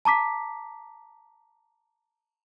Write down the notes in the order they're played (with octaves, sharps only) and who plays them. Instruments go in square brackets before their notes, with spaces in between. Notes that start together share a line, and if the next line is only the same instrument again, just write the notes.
[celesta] A5 A#5 D6 B6